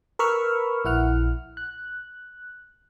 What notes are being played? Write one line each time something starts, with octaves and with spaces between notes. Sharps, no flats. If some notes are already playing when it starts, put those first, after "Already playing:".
A#4 B4 B5 C#6 E6 F6
A#1 E4 F#5 F6
F#6